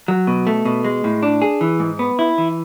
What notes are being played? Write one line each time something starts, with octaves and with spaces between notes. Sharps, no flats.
F#3
B2
A3
B2
G#3
A2
D4
G#4
E3
G#2
B3
E4
E3